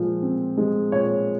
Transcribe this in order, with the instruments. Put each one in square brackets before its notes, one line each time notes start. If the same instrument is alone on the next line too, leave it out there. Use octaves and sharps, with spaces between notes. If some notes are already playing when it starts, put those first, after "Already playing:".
Already playing: [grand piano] A#2 F3 G#3
C4
G#3
A#2 C#5